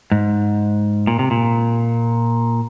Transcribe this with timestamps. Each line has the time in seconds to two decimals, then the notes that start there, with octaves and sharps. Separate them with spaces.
0.11 G#2
1.07 A#2
1.19 C3
1.31 A#2